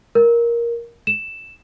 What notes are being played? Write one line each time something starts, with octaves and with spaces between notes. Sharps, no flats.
A#4
E7